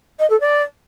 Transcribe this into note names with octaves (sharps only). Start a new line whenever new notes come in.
D#5
A4
D5